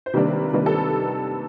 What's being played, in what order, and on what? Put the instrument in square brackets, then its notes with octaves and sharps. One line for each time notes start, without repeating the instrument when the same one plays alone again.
[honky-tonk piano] C5
C3 D#3 G3 A#3 D4 B4
C3 D#3 G3 A#3 D4 B4
A4